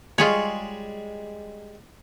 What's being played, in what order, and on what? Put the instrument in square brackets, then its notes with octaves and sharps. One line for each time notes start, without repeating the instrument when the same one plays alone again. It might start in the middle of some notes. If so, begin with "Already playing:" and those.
[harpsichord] G3 G#3 [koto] F4 G#4 C#5